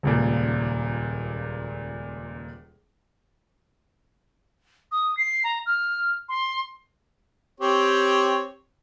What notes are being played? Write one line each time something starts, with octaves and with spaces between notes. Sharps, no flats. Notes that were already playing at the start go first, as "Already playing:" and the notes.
D#1 C#2 A#2
D#6
C7
A#5
F6
C6
C4 G4 C#5